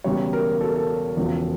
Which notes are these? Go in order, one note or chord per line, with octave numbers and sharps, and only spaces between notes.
E1 E2 C#3 G3 C#5
A#4
A4
A#4
A4
E1 E2 C#3 F3